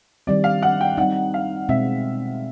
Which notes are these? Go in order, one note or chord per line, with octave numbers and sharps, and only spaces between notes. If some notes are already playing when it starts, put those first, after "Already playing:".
D#3 G3 C4 D5
F5
F#5
G5
G3 C4 D#4 F#5
F5
B2 G#3 C4 E5